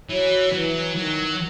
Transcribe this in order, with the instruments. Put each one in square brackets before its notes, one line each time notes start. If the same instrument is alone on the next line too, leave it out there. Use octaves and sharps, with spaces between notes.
[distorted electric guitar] E3 [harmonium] F#3
[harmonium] E3 [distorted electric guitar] F#3
[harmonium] D#3 [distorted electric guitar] F#3